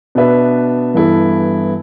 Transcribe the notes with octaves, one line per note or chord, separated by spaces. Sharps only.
B2 B3 D4 B4 E5
G2 E3 B3 E4 A4